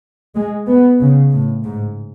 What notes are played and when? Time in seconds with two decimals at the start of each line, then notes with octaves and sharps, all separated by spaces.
0.36 G#3
0.68 B3
1.00 C#3
1.32 A2
1.64 G#2